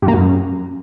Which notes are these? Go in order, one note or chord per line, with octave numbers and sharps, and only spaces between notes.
G2
A#3
F#2